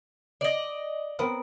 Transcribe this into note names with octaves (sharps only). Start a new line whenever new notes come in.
D5 D#5
B3 C4 A#4